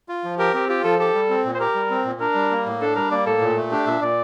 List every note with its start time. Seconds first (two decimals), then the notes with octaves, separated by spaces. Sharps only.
0.09 F4
0.24 F3
0.39 G4 A#4
0.54 C4 G4
0.69 F4 G4
0.84 F3 A4
0.99 G4 A4
1.14 G3
1.30 C4
1.45 A#2
1.55 C5
1.60 G4 A#4
1.75 G3
1.90 C4
2.05 A#2
2.20 D4 A#4
2.35 G3
2.51 A#3
2.66 A2
2.81 D4 A4
2.96 G3 A#4
3.11 A#3 D5
3.26 A2 A4
3.41 A#2
3.57 A3
3.71 D4 G4
3.87 A#2 E5
4.02 A#2 D5